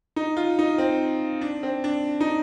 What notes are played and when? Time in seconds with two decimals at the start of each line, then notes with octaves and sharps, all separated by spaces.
0.16 D#4
0.37 F4
0.59 D#4
0.78 C4
1.41 D4
1.63 C4
1.84 D4
2.21 D#4